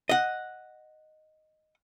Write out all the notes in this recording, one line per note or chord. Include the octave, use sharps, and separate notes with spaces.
D#5 F#5